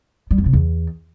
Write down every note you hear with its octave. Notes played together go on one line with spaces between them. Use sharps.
G3
F2
C3
E2